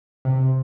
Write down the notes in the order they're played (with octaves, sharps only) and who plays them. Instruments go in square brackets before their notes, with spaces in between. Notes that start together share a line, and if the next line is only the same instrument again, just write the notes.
[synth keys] C3